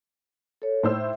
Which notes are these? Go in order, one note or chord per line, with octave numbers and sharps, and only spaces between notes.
A4 C#5
A2 C5 E6
E5